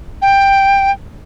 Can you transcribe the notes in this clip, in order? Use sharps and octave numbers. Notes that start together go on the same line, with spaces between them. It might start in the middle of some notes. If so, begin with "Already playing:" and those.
G5